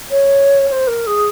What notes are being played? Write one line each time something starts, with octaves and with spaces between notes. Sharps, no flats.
C#5
C#5
C5
A#4
G#4